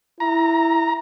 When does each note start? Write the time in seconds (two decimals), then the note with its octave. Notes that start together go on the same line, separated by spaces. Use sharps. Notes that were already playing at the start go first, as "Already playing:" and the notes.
0.20 E4 A#5